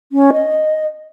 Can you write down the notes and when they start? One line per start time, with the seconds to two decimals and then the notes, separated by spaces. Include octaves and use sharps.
0.12 C#4
0.33 D#5